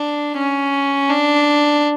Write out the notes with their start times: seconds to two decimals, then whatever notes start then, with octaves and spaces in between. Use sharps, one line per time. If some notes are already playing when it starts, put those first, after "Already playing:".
Already playing: D4
0.38 C#4
1.10 D4